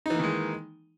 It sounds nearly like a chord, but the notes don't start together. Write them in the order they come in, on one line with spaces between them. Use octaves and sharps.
D#4 E3 A#3 D#3 G#3